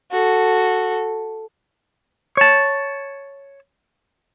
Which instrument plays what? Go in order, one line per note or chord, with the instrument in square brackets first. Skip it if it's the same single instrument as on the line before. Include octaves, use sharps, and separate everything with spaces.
[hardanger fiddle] F#4 A4
[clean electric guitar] C#5 A5